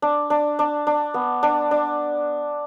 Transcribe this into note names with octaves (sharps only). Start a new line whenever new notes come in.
D4
D4
D4
D4
B3
D4
D4